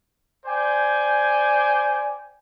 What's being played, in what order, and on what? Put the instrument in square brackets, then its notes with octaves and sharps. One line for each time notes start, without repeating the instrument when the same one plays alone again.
[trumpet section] C5 D5 G5 G#5